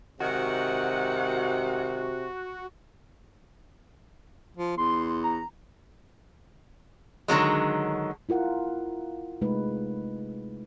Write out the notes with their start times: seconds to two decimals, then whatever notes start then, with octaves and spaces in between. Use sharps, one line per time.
0.20 G#2 C3 D#3 F#4 F#5
4.57 F3
4.78 E2 C6
5.24 A#5
7.28 D3 D#3 F#3 G#3
8.29 E4 F4 A#4 F#5
9.41 C3 G#3 A3 D#4 B4